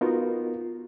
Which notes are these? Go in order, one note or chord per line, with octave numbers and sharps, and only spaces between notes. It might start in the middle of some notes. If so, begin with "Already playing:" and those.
B3 D#4 F4 F#4 A#4